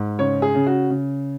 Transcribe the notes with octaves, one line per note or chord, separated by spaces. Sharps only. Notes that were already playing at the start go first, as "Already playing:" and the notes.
Already playing: G#2
C#3 C#5
G#4
C#3
F#4
C#3